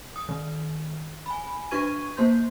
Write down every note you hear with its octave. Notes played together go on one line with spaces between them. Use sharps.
D#6
D#3
G#5 B5
D4 F#4 B4 C#6 G#6 D#7
A#3 C5 C6 G6